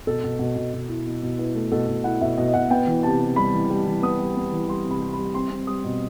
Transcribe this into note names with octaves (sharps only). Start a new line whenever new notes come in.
B2 A4
B2
B2
B2
B2
E4
B2
B2
E4 B4
A3
B2 A4
B2
E4 F#5
B2 E5
B2 D#5
B2 F#5
B3 G5
E3
C3 A5
C3
G3 B5
E3
G3
E3
B3 D#6
G3
B3
E3
G3 C6
C3
B5
G3
B5
G3
C4 C6
C4
G3 D#6
B2